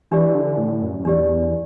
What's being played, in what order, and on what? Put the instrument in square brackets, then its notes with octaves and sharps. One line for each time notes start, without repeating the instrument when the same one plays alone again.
[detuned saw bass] E3 [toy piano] D4 G4 D5
[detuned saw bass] D3
A2
F#2
F#2
[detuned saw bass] E2 [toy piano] D4 G4 D5